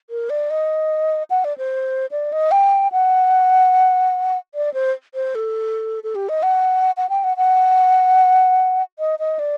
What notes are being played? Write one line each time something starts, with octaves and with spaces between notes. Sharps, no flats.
A#4
D5
D#5
F#5
D5
C5
D5
D#5
G5
F#5
D5
C5
C5
A4
A4
G4
D#5
F#5
F#5
G5
F#5
F#5
D#5
D#5
D5